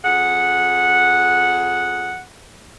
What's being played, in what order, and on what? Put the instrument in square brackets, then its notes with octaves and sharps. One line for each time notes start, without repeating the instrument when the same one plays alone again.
[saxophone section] F2 G#4 F#5